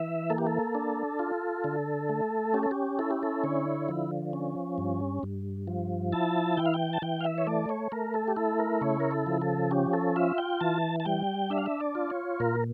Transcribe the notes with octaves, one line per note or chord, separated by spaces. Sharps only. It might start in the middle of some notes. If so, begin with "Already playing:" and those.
Already playing: E3 E5
A#3 A4
G4
A4
D4
F4
D3
A3
C#4 G4
A4
G4
E4 A4
G4
A4
D3 C#5
F3
C#4
G2
G2
F3
E4 A5
E3 G5
F5
G5
A5
E3 G5
F5
E5
C#5
A3 D5
C#5
A3 A#4
A4
G4
E4 A4
A#4
C#3 C#5
A#4
A4
F3
A4
C#4 G4
A4
F4 E5
G5
E3 A5
A5
G3 G5
D4 E5
F5
E5
D5
F4
C#5
A#2 A#4